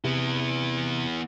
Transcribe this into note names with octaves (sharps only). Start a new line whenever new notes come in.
C3 B3 E4